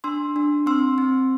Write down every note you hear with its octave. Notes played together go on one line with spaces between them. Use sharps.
D4 C6 E6
D4
C4 C6 E6
C4